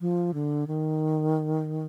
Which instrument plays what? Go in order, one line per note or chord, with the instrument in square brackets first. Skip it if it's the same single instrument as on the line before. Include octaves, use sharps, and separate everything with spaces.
[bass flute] F3
D3
D#3